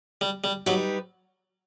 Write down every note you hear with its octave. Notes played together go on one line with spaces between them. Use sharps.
G3
G3
F#3 G3 D#4 G4 B4